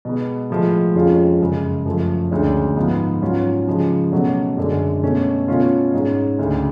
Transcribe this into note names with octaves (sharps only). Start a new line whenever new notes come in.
B2 G#3 B3
A2 F3 G#3
F2 F3 G#3 C#4 F4
F#2 C#3 G#3
F#2 F3 A3
D2 D3 G#3 C#4
G#2 F3 G#3 B3 F4
G#2 F#3 C#4 F4
C#3 F3 G#3
B2 F#3 A3 C#4
F#2 D3 G#3 D4
B2 A3 C#4
B2 A3 C#4 F4
G#2 G#3 C#4
D2 C#3 G#3